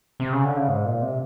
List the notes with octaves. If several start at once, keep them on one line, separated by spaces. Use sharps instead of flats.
C3
C#3
D3
C#3
G#2
A#2
C3